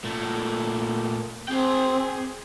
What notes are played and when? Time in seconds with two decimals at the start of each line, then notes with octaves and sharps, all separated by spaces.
0.04 A#2 A3
1.48 C4 G#4 G5